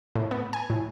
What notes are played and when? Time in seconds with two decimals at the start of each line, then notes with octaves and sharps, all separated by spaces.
0.15 A2
0.31 B3
0.53 G#5
0.70 A2